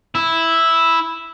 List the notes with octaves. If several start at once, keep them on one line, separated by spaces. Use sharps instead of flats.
E4